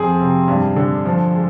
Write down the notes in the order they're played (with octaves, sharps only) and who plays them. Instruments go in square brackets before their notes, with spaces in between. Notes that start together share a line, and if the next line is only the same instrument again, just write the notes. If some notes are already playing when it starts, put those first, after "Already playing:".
Already playing: [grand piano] F2 F3 C4 [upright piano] G#4
[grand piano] C3
G2
D3
F3
G#3